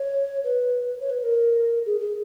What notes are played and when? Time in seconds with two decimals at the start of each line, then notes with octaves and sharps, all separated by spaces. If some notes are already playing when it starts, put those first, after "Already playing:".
Already playing: C#5
0.44 B4
1.01 C#5
1.10 B4
1.20 B4
1.23 A#4
1.86 G#4
2.00 G#4